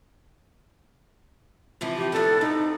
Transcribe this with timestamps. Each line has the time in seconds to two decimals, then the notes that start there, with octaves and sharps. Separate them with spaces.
1.81 C3 E3 F3
1.97 G4
2.12 B3 D4 A4
2.41 C3 D#4